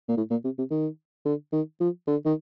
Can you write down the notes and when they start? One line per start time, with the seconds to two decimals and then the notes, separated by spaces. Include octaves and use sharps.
0.09 A#2
0.17 A2
0.30 A#2
0.44 C3
0.58 C3
0.71 D#3
1.25 D3
1.53 D#3
1.80 F3
2.07 D3
2.25 D#3